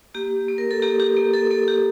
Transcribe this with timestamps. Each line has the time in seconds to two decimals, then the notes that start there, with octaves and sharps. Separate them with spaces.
0.14 A#3 G4
0.49 A#3
0.58 A#4
0.71 A4
0.82 A#3 G4
1.00 G4
1.17 A#3
1.34 A4
1.51 A#3 A4
1.68 G4